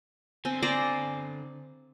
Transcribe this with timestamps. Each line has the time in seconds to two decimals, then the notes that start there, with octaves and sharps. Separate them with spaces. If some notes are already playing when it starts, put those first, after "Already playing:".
0.45 D3 C4 G#5
0.63 C5 D5 A#5